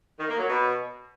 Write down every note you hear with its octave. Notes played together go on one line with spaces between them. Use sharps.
D#3
A#3
F#3
B2